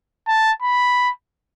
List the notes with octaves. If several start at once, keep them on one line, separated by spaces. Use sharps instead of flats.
A5
B5